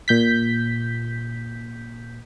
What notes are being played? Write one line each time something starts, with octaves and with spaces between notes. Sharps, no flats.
A#2 G6 B6